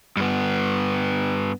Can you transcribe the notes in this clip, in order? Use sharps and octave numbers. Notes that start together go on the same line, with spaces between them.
G2 B3